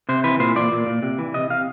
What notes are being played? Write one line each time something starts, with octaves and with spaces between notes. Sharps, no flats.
C3 C5
E3 B4
A#2 C5
A#2 D5
A#2
A#2
C3
E3
C3 D#5
C3 F5